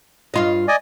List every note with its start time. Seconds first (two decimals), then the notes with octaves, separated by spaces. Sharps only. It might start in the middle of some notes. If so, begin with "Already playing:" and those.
0.34 G2 F4 D#5
0.68 D5 D#5 G#5